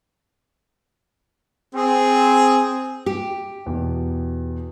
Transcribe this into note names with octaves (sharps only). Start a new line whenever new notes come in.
C4 G#4
G4
E2 B2